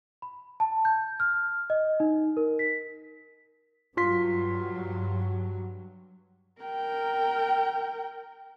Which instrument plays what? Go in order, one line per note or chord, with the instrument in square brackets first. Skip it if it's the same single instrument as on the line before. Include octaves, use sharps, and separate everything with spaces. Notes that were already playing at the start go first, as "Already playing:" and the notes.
[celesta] B5
A5
G6
F6
D#5
D#4
A#4
B6
[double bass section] G2 F#3 [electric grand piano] F4 C6 B6
[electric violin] A#4 G5